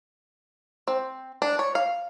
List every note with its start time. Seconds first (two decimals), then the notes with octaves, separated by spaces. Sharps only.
0.88 C4
1.42 D4
1.59 C#5
1.75 F5